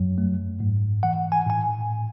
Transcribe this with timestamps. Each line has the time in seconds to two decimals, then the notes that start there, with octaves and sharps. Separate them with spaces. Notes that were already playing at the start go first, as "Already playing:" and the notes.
Already playing: F#2 F#3
0.18 A3
0.60 G#2
1.03 E3 F#5
1.32 G#5
1.46 A2 G#5